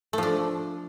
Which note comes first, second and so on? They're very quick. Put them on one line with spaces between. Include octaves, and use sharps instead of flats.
A3 F3 D4